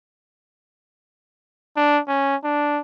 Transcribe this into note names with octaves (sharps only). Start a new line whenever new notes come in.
D4
C#4
D4